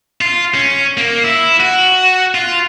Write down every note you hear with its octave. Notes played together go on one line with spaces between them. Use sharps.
F4
C#4
A#3
E4
F#4
F4